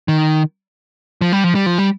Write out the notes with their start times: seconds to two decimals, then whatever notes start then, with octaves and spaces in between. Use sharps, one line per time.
0.08 D#3
1.21 F3
1.32 G3
1.44 F3
1.55 G3
1.66 F3
1.78 G3